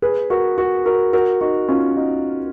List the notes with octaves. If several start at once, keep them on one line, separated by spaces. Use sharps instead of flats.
G#4 B4
F#4 A#4
F#4 A#4
F#4 A#4
F#4 A#4
D#4 F#4
C#4 F4
D#4 F#4